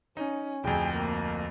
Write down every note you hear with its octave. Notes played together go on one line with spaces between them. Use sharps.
C#4 D#4
D1 F2 G#4 G5
A#3